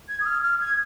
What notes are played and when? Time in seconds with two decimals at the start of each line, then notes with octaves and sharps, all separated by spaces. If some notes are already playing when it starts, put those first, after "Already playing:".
0.08 G#6
0.20 D#6
0.25 F6
0.43 F6
0.60 G#6